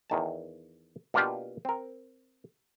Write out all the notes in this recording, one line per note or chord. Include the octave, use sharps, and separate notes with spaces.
E2 D#3 A5
B2 A#3 D4 F4 G4
C4 A#4